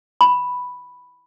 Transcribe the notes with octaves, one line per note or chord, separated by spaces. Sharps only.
B5